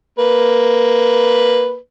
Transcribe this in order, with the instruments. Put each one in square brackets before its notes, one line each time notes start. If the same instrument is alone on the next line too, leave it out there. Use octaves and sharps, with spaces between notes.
[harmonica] A#3 B4